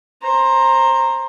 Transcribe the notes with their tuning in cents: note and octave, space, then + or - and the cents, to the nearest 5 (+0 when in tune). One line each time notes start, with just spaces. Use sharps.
C5 +20 A#5 +0